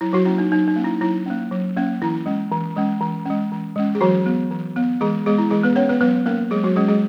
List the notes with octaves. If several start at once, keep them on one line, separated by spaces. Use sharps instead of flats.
F#3 E4
F#3 F#4
A#3 C#4 E4
D#4
F#3 D#4
D#4
A#3 C#4
E4
F#3 E4
A#3 C#4
F#3
A#3 C#4
E3 E4
G#3 C#4
E3
G#3 C#4
E3
G#3 C#4
E3
G#3 C#4
G#4
E3 F#3 F#4
B3
E3
B3
E3 G#3 G#4
G#3 B3 G#4
E4
E3 G#3 G#4
B3 B4
B3 C#4 C#5
B3 B4
F#3 B3 B4
A#3 C#4 A#4
F#3 G#3 G#4
F#3 F#4
G#3 C#4 G#4
G#3 G#4